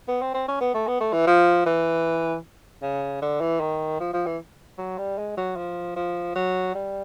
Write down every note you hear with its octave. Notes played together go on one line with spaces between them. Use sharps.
B3
C4
C4
C#4
B3
A3
B3
A3
E3
F3
E3
C#3
D3
E3
D#3
F3
F3
E3
F#3
G3
G#3
F#3
F3
F3
F#3
G3